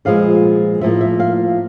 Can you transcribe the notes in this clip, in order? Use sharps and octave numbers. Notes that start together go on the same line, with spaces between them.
A#2 F3 G#3 B3 F5
A2 F3 A#3 E5
E5
F5